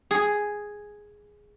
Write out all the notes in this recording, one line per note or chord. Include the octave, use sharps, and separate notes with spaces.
G#4